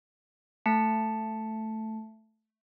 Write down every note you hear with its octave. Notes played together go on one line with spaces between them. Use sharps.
A3 A5 B6 C#7